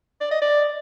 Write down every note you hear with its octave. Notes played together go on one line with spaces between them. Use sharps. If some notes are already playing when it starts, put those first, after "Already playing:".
D5
D#5
D5